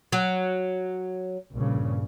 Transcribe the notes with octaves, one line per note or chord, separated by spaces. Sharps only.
F#3
A#1 G2 C#3